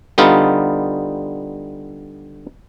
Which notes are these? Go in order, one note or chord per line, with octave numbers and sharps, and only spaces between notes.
D3 G3 B3 D#4 F4